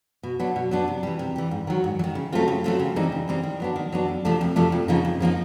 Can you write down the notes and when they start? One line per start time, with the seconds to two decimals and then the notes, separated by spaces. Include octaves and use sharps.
0.23 B2
0.40 F#3 B3 D4
0.56 B2
0.71 F#3 B3 D4
0.88 C3
1.03 E3 G3
1.19 C3
1.36 E3 G3
1.51 G#2
1.67 D#3 F#3
1.84 G#2
1.99 F#3
2.04 D#3
2.15 C#3
2.32 F#3 A3 C4 F4
2.48 C#3
2.64 F#3 A3 C4 F4
2.79 C#3
2.96 E3 G3 C4 D#4
3.12 C#3
3.28 E3 G3 C4 D#4
3.44 D#3
3.60 F#3 B3 D4
3.76 D#3
3.92 F#3 B3 D4
4.08 F2
4.25 C3 F3 A3 D4
4.41 F2
4.56 C3 F3 A3 D4
4.72 F2
4.88 C#3 F3 A#3 D#4
5.05 F2
5.20 C#3 F3 A#3 D#4